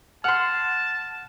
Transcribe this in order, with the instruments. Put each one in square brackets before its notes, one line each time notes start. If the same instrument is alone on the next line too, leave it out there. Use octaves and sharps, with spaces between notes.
[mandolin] F#5 C6 [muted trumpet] A5 [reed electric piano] F6